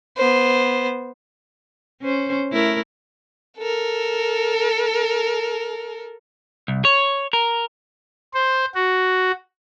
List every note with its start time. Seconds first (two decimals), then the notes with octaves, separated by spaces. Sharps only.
0.18 B3 C5
2.01 C#4 C5
2.52 A3 E4 A#4
3.58 A4 A#4
6.68 C2
6.85 C#5
7.33 A#4
8.34 C5
8.75 F#4